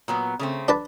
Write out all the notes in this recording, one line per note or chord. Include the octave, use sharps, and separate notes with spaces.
A#2 F#3 B3
C#3 A3 C4
D4 B4 A5